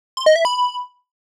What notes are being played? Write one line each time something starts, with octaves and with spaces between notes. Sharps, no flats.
C6
D#5
E5
B5